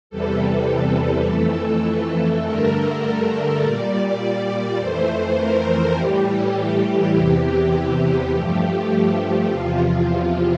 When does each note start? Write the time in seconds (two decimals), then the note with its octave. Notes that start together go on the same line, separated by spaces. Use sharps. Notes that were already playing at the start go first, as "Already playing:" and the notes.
0.10 E2 C3 E3 G3 A4
1.28 F2 E3 A3
2.45 G2 D3 A3 A#4
3.62 A#2 G3 D5
3.91 D5
4.21 D5
4.79 F2 E3 A3 C5
5.38 A#4
5.97 A2 E3 G3 G4
7.13 E2 C3 E3
8.31 G2 F3 A3 G4
9.48 E2 C3 F3 F4